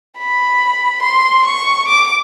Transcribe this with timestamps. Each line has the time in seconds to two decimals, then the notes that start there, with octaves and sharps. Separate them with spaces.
0.18 B5
1.02 C6
1.45 C#6
1.88 D6